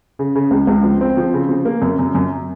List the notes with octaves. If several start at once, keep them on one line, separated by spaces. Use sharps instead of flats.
C#3
C#3
C#2
C#2
F3
C4
F3
C#3
F3
A#3
F#2
F#2
F#2